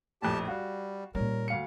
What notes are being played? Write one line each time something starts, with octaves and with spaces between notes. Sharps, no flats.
A#1 F2 A2 G4 A5
G3 F#4 F5
A#2 G3 C#4 A#4
D2 F5 C#7